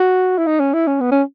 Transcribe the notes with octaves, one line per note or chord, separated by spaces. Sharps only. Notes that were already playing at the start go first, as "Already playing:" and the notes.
Already playing: F#4
E4
D#4
C#4
E4
C#4
B3
C#4